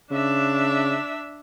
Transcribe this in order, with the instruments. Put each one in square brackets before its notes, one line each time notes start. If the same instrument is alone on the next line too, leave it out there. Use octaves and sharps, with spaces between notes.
[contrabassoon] C#3 [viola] D4 E5